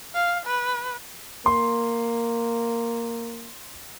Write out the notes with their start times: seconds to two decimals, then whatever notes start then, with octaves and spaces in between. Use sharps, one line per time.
0.15 F5
0.46 B4
1.46 A#3 C6